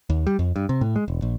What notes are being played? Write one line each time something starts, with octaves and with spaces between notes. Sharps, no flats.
D#2
G3
F2
G2
C3
A2
G#3
E1
A#1